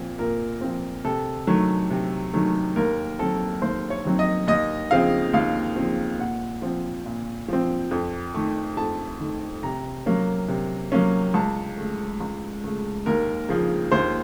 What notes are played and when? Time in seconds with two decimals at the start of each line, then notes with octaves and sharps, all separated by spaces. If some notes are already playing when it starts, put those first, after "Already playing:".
Already playing: A#2 F3 C4
0.19 A#2 A#4
0.61 F3 C4
1.05 C3 A4
1.47 D#3 F#3 A3
1.90 C3
2.33 D#3 F#3 A3
2.76 D#2 A#4
3.19 D#3 F#3 C4 A4
3.62 D#2 C5
3.90 C#5
4.05 D#3 F#3 C4
4.19 D#5
4.47 D#2 D#5
4.91 C#3 F3 C4 F5
5.33 D#2 F5
5.76 C#3 F3 C4
6.19 A#2 F#5
6.62 F3 C4
7.06 A#2
7.48 F3 C4
7.91 F2
8.34 D#3 A3
8.77 F2 A5
9.20 D#3 A3
9.63 C3 A#5
10.06 F#3 A#3 C#4
10.49 C3
10.92 F#3 A#3 C#4
11.34 C#2 A5
11.77 C#3 A3
12.21 C#2
12.64 C#3 A3
13.06 D#2 A#4
13.49 C#3 F3
13.92 D#2 C5